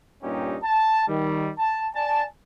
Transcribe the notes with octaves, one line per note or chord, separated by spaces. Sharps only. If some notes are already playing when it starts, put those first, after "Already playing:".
G2 A#2 C#4 D#4 G4
A5
D#3 G3
A5
D5 G#5 A5